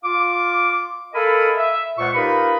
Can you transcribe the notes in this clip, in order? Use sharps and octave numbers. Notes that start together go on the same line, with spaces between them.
F4 F5 D6
A4 A#4 D#5 F5 G#5 B5
E5
C#2 A#2 C5 F#5 C#6
D#4 F4 G4 A#4 B4 B5